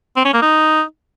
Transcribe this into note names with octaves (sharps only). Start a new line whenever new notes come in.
C4
C#4
A#3
D#4